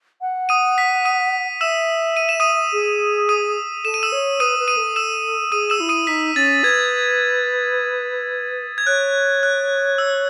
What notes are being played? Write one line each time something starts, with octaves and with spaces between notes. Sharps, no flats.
F#5
D#6 D#7
B6
D#6 D#7
E5 E6 E7
D#7
E7
D#6 D#7
G#4
D#6 D#7
A4 E7
D#7
E6 E7
C#5
B4 D#6 D#7
B4
D#6 D#7
A4
E6 E7
G#4 D#6 D#7
E6 E7
E4
D#6 D#7
D#4 B6
C#4 A6
B4 G#6
G#6
C#5 F#6
F#6
E6